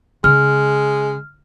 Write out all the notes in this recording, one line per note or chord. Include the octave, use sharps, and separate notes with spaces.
C#3 G#3 F6